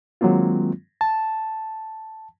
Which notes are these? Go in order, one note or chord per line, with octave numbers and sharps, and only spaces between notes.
D#3 F#3 G#3 A#3 C4 F4
A5